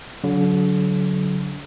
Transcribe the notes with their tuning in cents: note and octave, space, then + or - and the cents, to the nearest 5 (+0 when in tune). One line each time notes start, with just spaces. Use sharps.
D3 -35 F#3 +0